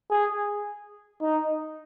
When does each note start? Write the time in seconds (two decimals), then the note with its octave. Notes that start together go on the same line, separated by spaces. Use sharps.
0.10 G#4
1.21 D#4